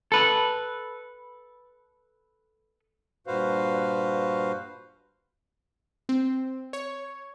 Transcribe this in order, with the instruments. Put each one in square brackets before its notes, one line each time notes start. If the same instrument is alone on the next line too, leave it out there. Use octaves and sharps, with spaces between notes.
[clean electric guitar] A4 B4
[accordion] G2 A#2 F#4 B4 C5 F5
[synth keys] C4
C#5